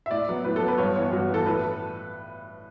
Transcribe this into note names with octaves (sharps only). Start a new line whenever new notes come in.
E5
A2 D5
F#3 B3
A2 B4
A4
F#3 B3
B4
G2 C#5
E3 B3 C#5
G2 F#4
E3 B3 A4
A2 B4